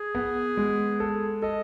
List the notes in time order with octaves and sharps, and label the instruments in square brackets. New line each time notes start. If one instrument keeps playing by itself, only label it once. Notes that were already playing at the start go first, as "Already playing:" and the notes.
Already playing: [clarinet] G#4
[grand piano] B3
G#3
A4
[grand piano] A4 [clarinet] D#5